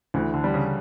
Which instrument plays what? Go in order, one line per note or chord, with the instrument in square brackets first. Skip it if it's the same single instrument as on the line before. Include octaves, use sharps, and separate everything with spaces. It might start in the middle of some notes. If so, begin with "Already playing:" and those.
[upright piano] D2 [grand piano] E3
[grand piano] D3
[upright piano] G3
[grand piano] C#3